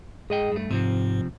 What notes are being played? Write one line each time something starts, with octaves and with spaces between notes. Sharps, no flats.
G#2 G#4 D#5 G5
G2 A3
G#2 C3 F3 C4